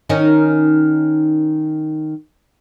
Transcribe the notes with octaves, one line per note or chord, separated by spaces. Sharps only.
D#3 C#4 D#4